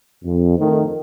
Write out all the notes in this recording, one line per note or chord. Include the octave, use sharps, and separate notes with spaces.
F2
A2 D#3